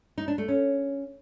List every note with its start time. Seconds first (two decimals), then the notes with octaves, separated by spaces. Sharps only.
0.18 D#4
0.28 D4
0.38 A3
0.48 C#4